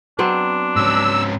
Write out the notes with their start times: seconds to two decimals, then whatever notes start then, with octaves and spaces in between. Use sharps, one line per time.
0.19 F#3 B3 C4 D4
0.76 G#2 C#4 E6